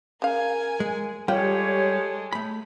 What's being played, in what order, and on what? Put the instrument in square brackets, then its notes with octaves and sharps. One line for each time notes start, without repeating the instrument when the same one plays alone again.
[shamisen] C#3 F5 [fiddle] A#4 G#5
[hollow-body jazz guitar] G#3
[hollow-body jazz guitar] G3 [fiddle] G#3 A4 [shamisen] F4 G5 [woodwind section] G4 C#5
[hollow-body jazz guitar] A3 B5